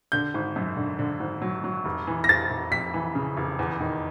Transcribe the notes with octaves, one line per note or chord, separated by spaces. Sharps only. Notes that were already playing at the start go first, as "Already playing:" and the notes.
D3 G6
G#1
F#2
D3
D3
G#1
F#3
F#3
F1
E3
A#6
F1 A6
F1
F2 B6
E3
C#3
F1
E2
D#3